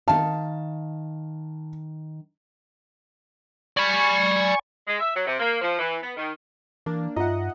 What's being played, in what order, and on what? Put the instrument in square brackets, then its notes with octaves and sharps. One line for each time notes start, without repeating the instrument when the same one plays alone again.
[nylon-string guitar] D#3 F5 [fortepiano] A5
[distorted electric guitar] D5 B5 [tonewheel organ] G#5 C#6
[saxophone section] G#3
E5
F#3
C3
A#3
F3
E3
B3
D#3
[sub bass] E3 [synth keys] A#3 D4
[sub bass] G2 [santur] D#4 E5 [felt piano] F4 [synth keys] D#5 F#5